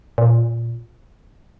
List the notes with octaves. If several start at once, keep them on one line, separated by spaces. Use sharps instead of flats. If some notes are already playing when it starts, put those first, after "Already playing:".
A#2